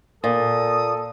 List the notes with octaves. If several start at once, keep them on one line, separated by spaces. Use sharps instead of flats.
A#2 A4 D#6